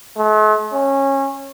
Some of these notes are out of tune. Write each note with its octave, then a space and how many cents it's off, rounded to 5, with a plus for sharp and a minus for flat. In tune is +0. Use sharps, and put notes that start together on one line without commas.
A3 -45
C#4 -20